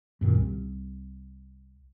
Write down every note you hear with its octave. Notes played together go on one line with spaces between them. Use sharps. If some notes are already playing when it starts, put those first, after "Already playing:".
F#2 A#2 D#3
C2